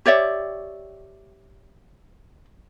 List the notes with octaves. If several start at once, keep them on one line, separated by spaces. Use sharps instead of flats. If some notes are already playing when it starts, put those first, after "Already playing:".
G4 C#5 D5 E5